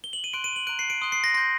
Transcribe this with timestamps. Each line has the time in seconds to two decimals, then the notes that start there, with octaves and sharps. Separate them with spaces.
0.04 G7
0.13 F#7
0.24 D#7
0.33 C6 F#6 D7
0.44 D#7
0.56 F#7
0.67 A#5 F#6 D7
0.79 C7
0.90 D7
1.01 C6 D#6 F#6
1.12 C7
1.24 A#6
1.34 C6 A#6
1.38 G6